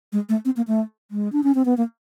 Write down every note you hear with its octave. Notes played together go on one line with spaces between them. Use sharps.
G#3
A3
C4
A#3
A3
G#3
D4
C#4
C4
B3
A#3